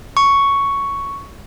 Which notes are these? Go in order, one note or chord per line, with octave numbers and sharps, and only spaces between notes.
C#6